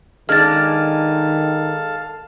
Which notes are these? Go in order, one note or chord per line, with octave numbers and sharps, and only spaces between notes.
D#3 G#3 D4 A4 F5 A5 F6 A6